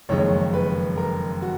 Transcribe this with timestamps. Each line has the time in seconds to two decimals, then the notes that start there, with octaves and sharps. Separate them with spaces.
0.09 F#1 F2 D#3 G#3 C#5
0.53 B4
0.98 A#4
1.42 F#4